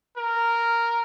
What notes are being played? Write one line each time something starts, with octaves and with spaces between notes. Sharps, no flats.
A#4